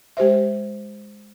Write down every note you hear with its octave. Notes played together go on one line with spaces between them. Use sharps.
G#3 G4 C5 E5